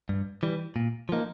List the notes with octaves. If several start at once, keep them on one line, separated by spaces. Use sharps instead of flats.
G2
E3 G3
A#2
F3 A#3 D#4